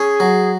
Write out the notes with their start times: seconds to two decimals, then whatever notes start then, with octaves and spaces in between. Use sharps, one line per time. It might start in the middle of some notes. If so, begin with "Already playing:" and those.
Already playing: C#4 G#4
0.20 F#3